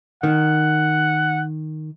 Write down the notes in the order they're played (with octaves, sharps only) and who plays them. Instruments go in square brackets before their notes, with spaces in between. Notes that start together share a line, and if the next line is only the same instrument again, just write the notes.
[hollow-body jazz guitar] D#3 [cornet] F#5